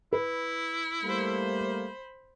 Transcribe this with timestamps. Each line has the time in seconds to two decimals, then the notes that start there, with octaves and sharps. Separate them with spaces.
0.13 E4 B4
1.02 G3 A3 A#3 C5 B5